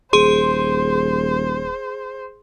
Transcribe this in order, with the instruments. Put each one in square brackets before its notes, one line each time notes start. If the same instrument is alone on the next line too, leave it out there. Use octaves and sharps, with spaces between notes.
[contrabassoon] D#1 [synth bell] G#4 C6 [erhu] C5